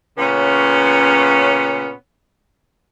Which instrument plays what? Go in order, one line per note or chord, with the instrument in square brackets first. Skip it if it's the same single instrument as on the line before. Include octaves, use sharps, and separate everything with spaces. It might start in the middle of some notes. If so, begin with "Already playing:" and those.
[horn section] A#2 C#3 B3 C#4